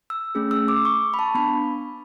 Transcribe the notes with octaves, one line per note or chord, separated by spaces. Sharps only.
E6
A3 C#4 G#4
E6
D6
C#6
B5
A5
B3 D4 B5